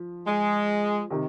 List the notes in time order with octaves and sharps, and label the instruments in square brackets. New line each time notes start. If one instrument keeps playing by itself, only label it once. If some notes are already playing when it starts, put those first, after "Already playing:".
Already playing: [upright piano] F3
[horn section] G#3
[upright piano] C3 D#3